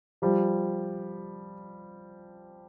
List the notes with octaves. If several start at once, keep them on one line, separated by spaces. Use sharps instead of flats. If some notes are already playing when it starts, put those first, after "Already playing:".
F3 G3